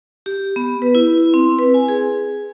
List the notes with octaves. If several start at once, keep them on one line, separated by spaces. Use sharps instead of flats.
G4
B3
B4
E4
C4
B4
G#5
G#4